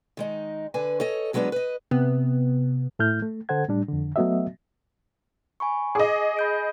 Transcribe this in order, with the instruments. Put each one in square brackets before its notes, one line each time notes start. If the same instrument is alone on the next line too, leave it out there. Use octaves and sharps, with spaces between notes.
[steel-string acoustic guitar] D#3 G#3 D#4
D3 B4 G#5
A4 C#5 D#5
C#3 F#3 G#3 B3 D4 B4
B4 D#5
[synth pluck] C3 B3
[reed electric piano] A2 A3 E4 F6 G6
A3
D3 A4 C5 F#5 G#6
A2 G3 D4
F2 D3
F#3 A3 B3 F#4 D#5 E5
[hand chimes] G#5 B5 C#6
[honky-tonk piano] G#4 D#5 [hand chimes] D6
[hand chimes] B5 G6 D7